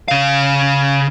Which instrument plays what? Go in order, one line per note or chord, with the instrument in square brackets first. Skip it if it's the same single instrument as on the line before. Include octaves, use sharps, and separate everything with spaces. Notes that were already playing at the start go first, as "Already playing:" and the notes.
[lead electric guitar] C#3 F5